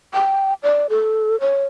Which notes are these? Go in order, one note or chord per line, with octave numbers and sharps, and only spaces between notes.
G5
D5
A4
C#5